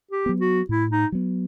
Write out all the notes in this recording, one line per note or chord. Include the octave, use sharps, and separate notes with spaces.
G4
F#3 B3
F#4
A2 E4
D#4
F#3 B3